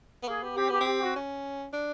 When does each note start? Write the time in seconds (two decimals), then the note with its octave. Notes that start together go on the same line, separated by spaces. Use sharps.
0.23 B3
0.28 A#3 G#4
0.43 B3 G4
0.57 C4 G4
0.69 B3 G4
0.80 C4
0.87 G4
1.01 F#4
1.16 C#4
1.73 D4